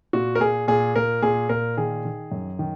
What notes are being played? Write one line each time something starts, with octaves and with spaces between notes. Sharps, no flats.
A#2 F#4
A#4
A#2 G#4
A#2 G#4
A#2 A#4
A#2 G#4
A#2 A#4
D#3 G#4
D#3
F#2
D#3